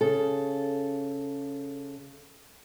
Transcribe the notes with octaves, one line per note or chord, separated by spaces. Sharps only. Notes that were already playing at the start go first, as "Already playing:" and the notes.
C#3 A4